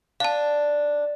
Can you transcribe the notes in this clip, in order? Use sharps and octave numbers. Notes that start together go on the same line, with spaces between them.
D4 F5 A5